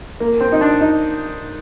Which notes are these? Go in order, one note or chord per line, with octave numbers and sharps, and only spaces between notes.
A#3
C4
D#4
D4
D#4